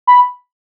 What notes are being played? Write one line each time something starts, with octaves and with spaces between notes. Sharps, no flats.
B5